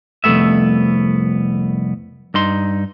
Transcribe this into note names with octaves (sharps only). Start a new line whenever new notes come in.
C2 F2 G#2 A3 B3 E5
G2 D#4 C6